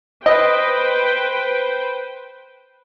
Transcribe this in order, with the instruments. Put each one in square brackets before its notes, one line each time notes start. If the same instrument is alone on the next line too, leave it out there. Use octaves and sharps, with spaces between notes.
[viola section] B4 C5 G5 [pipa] D#5